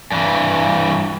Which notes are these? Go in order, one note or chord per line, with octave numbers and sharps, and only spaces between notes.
G2 E3